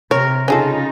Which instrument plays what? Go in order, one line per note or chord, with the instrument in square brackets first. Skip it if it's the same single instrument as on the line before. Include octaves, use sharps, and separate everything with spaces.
[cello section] C3 [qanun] A#4 [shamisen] C#5
[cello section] C#3 D#4 F4 [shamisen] C#4 G#4 A4